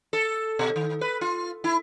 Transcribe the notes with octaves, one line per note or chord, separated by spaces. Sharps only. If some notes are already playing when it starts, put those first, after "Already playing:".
A4
B2
D#3
B4
F4
E4